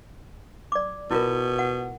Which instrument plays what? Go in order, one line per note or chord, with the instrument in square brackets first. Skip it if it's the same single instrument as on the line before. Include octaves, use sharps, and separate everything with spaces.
[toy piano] D5 D6
[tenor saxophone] B2 [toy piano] E4 F4 A#4
[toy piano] F#5